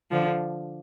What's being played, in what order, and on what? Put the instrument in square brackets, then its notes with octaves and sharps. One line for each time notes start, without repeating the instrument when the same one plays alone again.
[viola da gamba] D3 F3